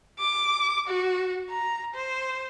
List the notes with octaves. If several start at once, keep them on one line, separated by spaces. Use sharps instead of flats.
D6
F#4
A#5
C5